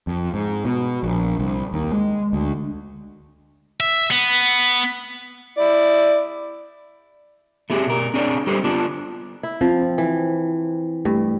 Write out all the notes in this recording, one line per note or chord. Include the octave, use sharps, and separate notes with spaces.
F2
G#2
B2
A#1
C2
D#2
G#3
D2
E5
B3
E4 D5
A3 B3 G4 G#4
B2 A#4
C4 D4 G#4 C#5 D5
G3 G4 A4 C5
B3 D4 F4
E4
F3 C4
E3
G2 A3